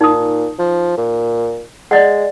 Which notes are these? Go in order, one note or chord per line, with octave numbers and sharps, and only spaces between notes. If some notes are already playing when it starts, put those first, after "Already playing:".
A#2 D#4 D#6
F3
A#2
G#3 D5 D#5 F#5